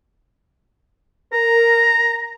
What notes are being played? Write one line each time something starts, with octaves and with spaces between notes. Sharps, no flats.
A#4 A#5